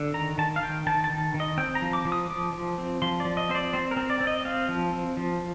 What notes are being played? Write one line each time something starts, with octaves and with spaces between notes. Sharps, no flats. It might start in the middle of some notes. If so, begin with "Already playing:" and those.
Already playing: D3
D#3 A#5
D#3 A5
F5
D#3 G5
D#3 A5
A5
D#3
D#3
D#5
C4 G5
A#5
F3
D6
F3
D#6
F3 D6
F3
C4
F3 C6
F3 D5
D#5
C4 C5
D5
C4 C5
A#4
C4
D5
C4
D#5
C4 F5
F3
C4
F3